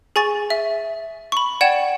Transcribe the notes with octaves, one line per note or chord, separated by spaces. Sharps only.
G#4 G#5 C#6 A6
E5
B5 C#6
D5 F#5 G5 G#6 E7